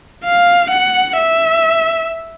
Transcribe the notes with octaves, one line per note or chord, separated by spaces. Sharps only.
F5
F#5
E5